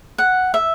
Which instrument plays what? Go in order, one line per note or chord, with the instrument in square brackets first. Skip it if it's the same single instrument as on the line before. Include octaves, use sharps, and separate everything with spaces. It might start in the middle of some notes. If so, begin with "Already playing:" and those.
[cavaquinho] F#5
E5